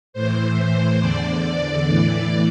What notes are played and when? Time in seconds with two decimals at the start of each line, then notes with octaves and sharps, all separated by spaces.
0.13 A2 E3 C5
0.57 C5
1.00 E2 D3 D5
1.86 A2 E3